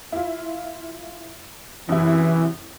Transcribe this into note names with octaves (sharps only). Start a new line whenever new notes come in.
E4 F4
F#2 C3 E3 E4